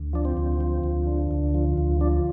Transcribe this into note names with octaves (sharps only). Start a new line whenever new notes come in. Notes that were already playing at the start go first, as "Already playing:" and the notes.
Already playing: D2
F3 D4
C4
D2
F3
D2
D3
D2
F3
D2
F3 D4